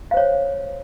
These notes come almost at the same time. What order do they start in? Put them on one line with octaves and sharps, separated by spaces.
F5 C5 C#5